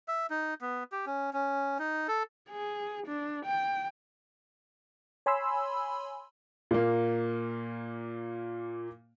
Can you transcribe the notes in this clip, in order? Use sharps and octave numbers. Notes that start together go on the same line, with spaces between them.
E5
D#4
B3
G4
C#4
C#4
D#4
A4
G#4
D4
G5
C#5 G#5 B5 C6 E6
A#2 A#3